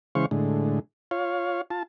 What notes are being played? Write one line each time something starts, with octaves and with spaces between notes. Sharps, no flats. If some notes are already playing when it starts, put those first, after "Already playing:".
C#3 E3 G#3 C5 F5 C#6
A2 D3 G#3
F4 C#5 F5
F4 A5